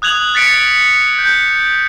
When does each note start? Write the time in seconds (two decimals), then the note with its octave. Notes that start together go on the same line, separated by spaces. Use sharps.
0.02 D#6 F#6 G#6 F7 F#7
0.34 F#6 A6 B6 C#7 D7
1.19 G6